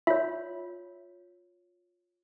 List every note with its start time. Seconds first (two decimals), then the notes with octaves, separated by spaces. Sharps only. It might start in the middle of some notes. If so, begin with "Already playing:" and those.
0.07 F4 C#5 E5